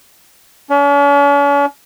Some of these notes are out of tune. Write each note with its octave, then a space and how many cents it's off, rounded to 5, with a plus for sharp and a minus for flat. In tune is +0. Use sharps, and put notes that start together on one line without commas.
C#4 +45